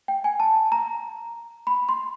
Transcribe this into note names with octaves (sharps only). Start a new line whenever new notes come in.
G5
G#5
A5
A#5
B5
C6